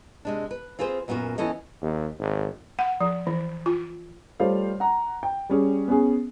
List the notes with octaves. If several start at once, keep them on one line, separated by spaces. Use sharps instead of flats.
C3 G#3 D4
B4
C4 F4 G#4 B4 C5
F#2 A#2 B3 C#4 F#4
E3 B3 C#4 A4 D#5
D#2
G#1
F#5
F3
E3
F4
G3 A3 F4 C5 C#5 F5
F#5 A#5
G5
G3 C#4 G#4
B3 C#4 G#4